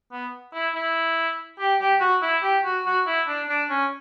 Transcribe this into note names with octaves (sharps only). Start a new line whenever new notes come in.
B3
E4
E4
G4
G4
F#4
E4
G4
F#4
F#4
E4
D4
D4
C#4